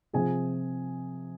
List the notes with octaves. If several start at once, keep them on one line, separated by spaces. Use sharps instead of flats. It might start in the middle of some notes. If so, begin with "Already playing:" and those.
C3 F3 G#4 G#5